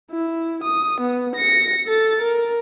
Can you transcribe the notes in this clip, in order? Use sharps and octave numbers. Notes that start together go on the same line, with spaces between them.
E4
D#6
B3
A#6 C#7
A4 A6
A#4